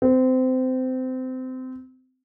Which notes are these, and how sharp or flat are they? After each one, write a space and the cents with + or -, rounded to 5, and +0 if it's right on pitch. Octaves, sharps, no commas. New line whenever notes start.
C4 -25